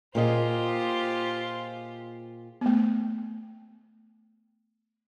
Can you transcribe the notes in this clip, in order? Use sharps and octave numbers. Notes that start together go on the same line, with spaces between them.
A#2 F4 G4 G#4 C5 D#5
A3 B3